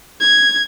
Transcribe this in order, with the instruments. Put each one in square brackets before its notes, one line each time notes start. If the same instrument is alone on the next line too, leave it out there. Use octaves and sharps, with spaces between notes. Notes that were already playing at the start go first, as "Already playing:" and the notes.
[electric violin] G#6